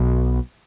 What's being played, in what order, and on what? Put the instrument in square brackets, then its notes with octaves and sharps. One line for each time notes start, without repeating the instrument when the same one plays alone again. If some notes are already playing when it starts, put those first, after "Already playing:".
Already playing: [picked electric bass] B1 B2